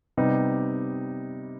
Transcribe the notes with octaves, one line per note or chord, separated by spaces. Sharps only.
C3 G3 B3 D#4